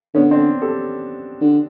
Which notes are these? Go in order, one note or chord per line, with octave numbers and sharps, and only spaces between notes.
D3 B3 C#4
C4 D4
G4 A4
D3